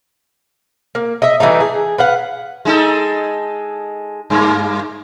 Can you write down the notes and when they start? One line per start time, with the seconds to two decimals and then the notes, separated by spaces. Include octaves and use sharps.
0.95 A#3
1.22 D#5 E5
1.40 E3 G3 A3 D#4
1.60 G#4
1.98 B4 F5 F#5
2.65 G#3 D#4 A4
4.30 G2 G#3 A#3